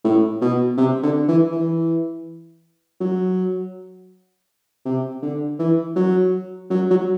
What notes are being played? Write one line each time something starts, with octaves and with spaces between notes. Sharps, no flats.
A2
B2
C3
D3
E3
E3
F#3
C3
D3
E3
F#3
F#3
F#3